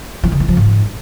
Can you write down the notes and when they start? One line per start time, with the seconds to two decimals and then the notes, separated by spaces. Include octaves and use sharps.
0.23 F3
0.32 D3
0.40 E3
0.49 F3
0.57 G#2